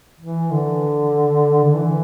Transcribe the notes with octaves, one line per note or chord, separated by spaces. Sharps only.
E3
D3
D3
E3